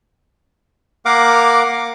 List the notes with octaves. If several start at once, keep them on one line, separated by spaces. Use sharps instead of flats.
A#3 A#4 F5 F#5 D6